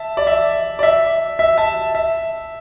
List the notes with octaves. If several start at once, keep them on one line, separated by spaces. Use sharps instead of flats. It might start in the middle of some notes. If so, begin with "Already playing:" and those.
Already playing: E5 A5
D5
E5
D5
E5
E5
E5 A5
E5